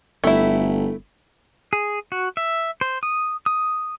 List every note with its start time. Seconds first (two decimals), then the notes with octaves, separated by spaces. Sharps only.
0.24 G1 A3 E4
1.73 G#4
2.12 F#4
2.37 E5
2.81 C5
3.03 D#6
3.46 D#6